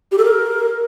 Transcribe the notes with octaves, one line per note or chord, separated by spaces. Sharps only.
G4
A4
A#4